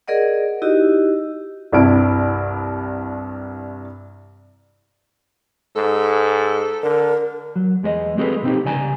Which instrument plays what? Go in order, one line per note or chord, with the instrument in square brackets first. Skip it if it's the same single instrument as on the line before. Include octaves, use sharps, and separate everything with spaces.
[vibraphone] G#4 A#4 D5 D#5 F#5
D#4 E4 F#4 G4 D#5
[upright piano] C2 G2 C3 E4 D7
[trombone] G#2 [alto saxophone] A4
[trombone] D3 [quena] A#4
[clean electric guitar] F#3
E2 G#3 A#4 D#5
G#3 C4 F#4 G#4 A4 B4
B2 D3 C4 D#4 G4
C2 C#3 D5 G#5 A#5